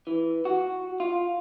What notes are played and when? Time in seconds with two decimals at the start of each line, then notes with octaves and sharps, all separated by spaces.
0.07 E3
0.45 F#4
1.00 F4